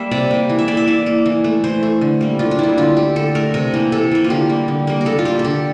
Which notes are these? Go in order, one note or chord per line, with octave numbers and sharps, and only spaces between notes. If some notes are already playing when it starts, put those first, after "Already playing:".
Already playing: G3 A#3 E5
C3 D5
G3 A#3
E3
E5
A#3 D5
E5
E3 D5
A#3
E3
A3
E3 C5
A3
D3
G3 A#3
D3 F4
D4
G3 A#3 E4
D3 F4
A3 G4
D3 A4
A3 A#4
C3 A#4
E3 A#3
C3 A4
E3 A#3
F4
D3 G4
G3 A#3
D3
G3 A#3
A#4
D3 A4
F4
G3 A#3 G4
A4
D3 G4